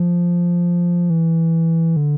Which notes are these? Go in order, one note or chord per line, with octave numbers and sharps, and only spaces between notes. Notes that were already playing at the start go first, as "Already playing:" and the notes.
Already playing: F3
E3
D3